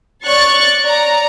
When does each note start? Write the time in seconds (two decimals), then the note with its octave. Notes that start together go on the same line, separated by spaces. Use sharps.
0.24 C#5 D5 C#6 F#6 A6
0.84 D5 A#5